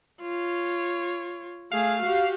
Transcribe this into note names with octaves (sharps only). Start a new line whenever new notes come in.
F4 C#5
A3 G#4 F5
F#4 G4